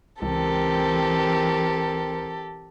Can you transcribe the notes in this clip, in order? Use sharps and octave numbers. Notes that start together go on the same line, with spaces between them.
C#2 E3 C4 G4 A4 A#4